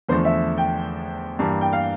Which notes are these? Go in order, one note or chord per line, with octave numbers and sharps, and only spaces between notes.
E2 D3 F3 A3 C5
E5
G5
G2 E3 G3 A#3 A5
G5
F5